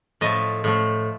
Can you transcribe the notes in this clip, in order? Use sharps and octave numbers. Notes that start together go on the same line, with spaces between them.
A2 F3 A3 D#5
A2 F3 A3